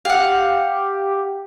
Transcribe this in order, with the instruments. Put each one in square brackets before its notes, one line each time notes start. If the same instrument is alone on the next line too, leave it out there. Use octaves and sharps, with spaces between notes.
[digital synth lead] G4 [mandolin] F5 F#5